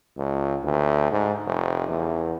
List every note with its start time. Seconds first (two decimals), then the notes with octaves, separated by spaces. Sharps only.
0.17 C#2
0.63 D2
1.11 G#2
1.45 F1
1.88 E2